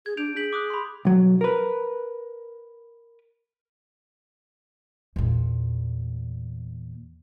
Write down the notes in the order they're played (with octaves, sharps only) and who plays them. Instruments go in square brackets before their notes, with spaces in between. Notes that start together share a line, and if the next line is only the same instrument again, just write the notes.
[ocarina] G#4 [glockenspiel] G#6
[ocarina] D4 [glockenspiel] G6 D7 F7
[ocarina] G#4 [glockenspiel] G6 B6 F#7
[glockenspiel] D6 D#6 F#6
B5 C6
[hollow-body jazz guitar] B1 F#3
A#4 B4
[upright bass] E2 A#2